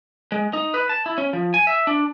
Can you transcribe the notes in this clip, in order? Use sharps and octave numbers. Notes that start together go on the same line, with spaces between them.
G#3
D#4
B4
A5
E4
C#4
F3
G#5
E5
D4